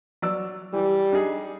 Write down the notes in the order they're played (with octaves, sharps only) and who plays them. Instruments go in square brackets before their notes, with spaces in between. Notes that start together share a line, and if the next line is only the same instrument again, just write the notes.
[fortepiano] F#3 D5 E6
[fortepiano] E3 [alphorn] G3
[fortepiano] D4 D#4 G#4